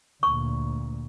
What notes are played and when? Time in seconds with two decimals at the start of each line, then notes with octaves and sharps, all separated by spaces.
0.23 D2 A#2 C#6